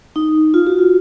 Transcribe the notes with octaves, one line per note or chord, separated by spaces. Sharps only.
D#4
F4
F#4
F4